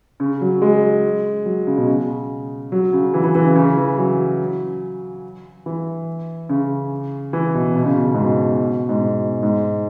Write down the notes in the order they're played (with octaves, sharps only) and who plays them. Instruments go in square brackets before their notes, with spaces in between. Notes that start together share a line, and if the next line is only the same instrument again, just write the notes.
[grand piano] C#3
F#3
G#3
F#3
C#3
B2
C#3
F#3
C#3
E3
E3
E3
C#3
C#3
E3
F#3
E3
C#3
E3
B2
B2
C#3
B2
B2
G#2
B2
G#2
B2
G#2